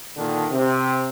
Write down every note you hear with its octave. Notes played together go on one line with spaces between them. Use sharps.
A#2 D3 D#3 D4
C3